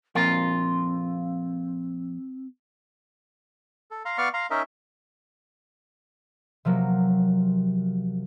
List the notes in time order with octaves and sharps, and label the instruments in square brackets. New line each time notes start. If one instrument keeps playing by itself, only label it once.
[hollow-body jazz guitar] F2 A#2 A#4 [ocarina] C4 [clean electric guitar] F4
[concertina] A4
F5 A#5 C6
B3 D5 F5 C#6 F6
F5 A#5 C6
C#4 D#4 A#4 D#5 E5
[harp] C3 F3 F#3 A#3